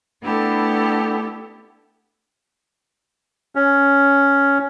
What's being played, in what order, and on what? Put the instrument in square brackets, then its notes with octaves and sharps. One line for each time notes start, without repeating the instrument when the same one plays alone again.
[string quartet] A3 B3 D4 E4 G4 A4
[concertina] C#4